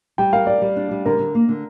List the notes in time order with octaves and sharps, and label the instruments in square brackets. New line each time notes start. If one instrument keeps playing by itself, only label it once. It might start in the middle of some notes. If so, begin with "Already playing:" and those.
[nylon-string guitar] G3 [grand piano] G5
[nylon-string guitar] A#4 [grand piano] F5
[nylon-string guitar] G3 [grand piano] D5
[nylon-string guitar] G3
D4
G3
[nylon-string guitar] D3 [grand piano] A#4
[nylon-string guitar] D3
A#3
D3